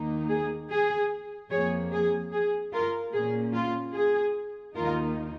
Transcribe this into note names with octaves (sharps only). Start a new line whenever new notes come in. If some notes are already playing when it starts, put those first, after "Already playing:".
Already playing: D#2 D#3 A#3 D#4
G#4
G#4
F2 F3 A#3 G#4 C#5
G#4
G#4
F4 A#4
A#2 A#3 C#4 G#4
F4
G#4
D#2 D#3 A#3 D#4 F4 A#4